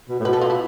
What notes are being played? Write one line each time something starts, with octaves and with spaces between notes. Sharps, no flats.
B2
A2
B2 B4
A4
F4
E4